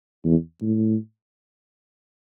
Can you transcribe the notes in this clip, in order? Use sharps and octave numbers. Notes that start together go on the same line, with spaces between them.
E2
A2